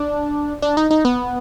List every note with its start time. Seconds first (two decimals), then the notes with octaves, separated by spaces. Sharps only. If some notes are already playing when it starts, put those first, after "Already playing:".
Already playing: D4
0.62 D4
0.77 D#4
0.90 D#4
1.05 B3